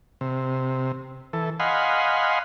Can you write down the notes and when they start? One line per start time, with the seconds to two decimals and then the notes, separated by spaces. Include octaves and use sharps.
0.21 C3
1.33 E3 A4
1.60 D#5 F5 F#5 G#5 B5 C6